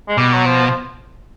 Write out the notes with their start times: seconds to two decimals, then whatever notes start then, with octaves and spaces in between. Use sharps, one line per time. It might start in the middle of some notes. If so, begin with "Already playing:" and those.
0.08 G#3
0.18 B2 G3
0.34 F#3
0.46 F3
0.68 F3